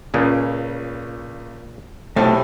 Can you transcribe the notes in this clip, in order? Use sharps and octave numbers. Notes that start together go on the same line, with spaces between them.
C#2 A#2 C#3 G#4
B1 A2 C3 A3 A5